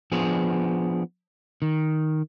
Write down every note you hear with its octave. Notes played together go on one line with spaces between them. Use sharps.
F3 B3 D4 G#4
D#3